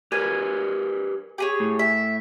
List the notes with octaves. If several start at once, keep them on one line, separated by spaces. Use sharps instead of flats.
G4 A#4 B4 G#5
G4 G#4 C#5
A2
E5